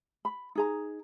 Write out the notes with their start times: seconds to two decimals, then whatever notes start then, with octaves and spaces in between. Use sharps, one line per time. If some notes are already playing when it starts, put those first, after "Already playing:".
0.25 B5
0.55 D#4 G#4 A#5